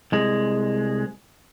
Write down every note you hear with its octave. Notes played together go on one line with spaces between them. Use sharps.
C2 G#3